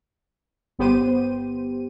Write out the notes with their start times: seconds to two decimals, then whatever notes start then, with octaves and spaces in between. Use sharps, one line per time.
0.79 G1 B3 G4 C5 D#7